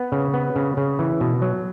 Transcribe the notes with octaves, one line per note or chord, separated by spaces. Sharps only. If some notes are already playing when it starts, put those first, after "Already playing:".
Already playing: B3
C#3
B3
C#3
C#3
E3
B2
F#3